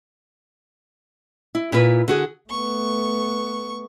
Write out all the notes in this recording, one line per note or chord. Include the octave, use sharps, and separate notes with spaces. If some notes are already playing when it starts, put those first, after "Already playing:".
E4
A#2 E4 F4 B4
D3 F#4 G#4
A3 B3 C#6